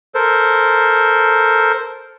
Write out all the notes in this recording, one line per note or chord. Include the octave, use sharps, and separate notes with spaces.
A4 A#4 C5